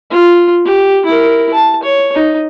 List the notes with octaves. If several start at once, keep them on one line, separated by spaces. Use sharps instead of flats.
F4
G4
E4 A#4
A5
C#5
D#4